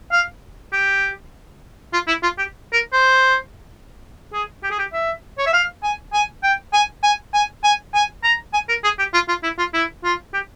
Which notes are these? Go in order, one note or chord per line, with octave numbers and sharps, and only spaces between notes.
F5
G4
F4
E4
F4
G4
A#4
C5
G#4
G4
G#4
G4
E5
C#5
E5
F5
G#5
G#5
G5
G#5
G#5
G#5
G#5
G#5
A#5
G#5
A#4
G#4
G4
F4
F4
E4
F4
E4
F4
G4